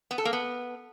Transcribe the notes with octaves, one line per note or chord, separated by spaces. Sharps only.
B3
A4
A#3
B3